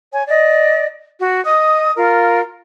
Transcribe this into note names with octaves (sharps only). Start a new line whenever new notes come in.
C#5 G#5
D5 D#5
F#4
D#5 D#6
F4 A#4 F5